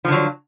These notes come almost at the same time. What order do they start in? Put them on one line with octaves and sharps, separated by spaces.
F3 D3 F#3